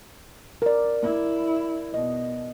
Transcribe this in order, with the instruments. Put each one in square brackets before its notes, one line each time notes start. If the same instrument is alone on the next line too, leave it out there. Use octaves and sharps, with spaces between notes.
[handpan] A#4 D5
[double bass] E4
[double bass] B2 [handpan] D#5